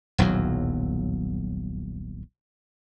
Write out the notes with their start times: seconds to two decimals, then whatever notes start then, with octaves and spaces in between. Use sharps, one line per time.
0.18 D#1 B1 E2 F#3